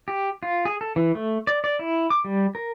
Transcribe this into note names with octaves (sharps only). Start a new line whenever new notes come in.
G4
F4
G#4
A4
E3
A3
D5
D5
E4
D6
G3
A#4